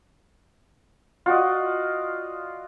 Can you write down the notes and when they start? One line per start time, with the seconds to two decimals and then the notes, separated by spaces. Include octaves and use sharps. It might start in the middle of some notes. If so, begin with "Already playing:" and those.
1.26 F4 F#4 D5 D#5